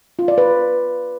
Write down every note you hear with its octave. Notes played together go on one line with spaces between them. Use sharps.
F4
D5
B4